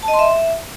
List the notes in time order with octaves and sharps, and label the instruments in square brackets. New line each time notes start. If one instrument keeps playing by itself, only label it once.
[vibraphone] A5
D#5
C6
E5